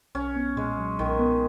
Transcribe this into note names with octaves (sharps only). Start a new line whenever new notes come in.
B1 C#4
B3
A#2 G#3
F#3
B1 D#3
B3